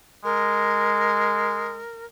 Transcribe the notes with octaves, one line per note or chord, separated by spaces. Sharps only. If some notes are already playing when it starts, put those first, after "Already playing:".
G#3 A#4